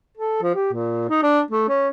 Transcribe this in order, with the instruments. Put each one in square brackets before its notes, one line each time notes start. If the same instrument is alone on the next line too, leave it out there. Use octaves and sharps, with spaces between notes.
[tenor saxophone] A4
F3
G4
A#2
D#4
D4
A3
C#4